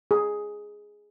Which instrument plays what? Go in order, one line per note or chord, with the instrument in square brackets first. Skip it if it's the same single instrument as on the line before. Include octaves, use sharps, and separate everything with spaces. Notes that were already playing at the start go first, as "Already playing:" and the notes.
[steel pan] G#4